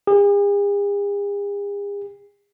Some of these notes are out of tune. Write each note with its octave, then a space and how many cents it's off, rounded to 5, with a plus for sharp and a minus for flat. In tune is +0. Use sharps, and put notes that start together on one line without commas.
G#4 -45